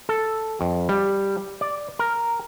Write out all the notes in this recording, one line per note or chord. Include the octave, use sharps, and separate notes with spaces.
A4
F2
G3
D5
A#4